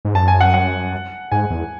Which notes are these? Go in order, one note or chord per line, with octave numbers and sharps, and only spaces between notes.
G#2
F#2 A5
G#5
F#5
F#5
G#2 G#5
E2